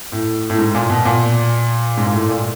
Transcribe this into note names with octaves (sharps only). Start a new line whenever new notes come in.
A2
A2
G#2
A#2
B2
A#2
G#2
A#2
A2
A#2